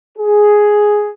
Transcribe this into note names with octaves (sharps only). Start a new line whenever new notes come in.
G#4